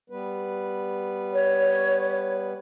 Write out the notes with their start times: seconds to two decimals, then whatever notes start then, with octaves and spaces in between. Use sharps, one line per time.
0.10 G3 B3 B4
1.33 C#5